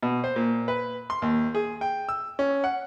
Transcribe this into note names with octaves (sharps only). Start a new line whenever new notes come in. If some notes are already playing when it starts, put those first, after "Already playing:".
B2
C5
A#2
B4
C6
D#2
G#4
G5
E6
C#4
F#5